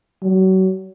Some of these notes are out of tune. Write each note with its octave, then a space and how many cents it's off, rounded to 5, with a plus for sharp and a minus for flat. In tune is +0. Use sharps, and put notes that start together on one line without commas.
F#3 +30